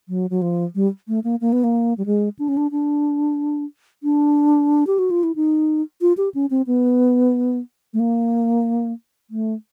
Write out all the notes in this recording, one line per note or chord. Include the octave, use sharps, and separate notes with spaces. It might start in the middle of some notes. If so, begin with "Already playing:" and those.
F#3
F#3
F3
G3
A3
A#3
A#3
B3
A#3
G3
G#3
D4
C#4
D4
D4
D4
G4
F#4
F4
E4
D#4
F4
G4
C#4
C4
B3
A3
A#3
A3